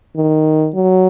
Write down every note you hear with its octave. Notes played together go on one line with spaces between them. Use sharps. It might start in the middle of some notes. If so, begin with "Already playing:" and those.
D#3
F#3